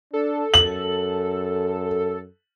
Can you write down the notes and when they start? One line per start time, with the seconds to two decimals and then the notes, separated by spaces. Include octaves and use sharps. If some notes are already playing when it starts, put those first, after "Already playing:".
0.13 D4 A4
0.54 F#2 F#7